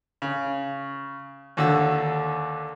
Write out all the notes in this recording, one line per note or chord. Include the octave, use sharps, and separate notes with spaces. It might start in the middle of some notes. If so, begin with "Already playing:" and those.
C#3
D#2 D3 F#4 E6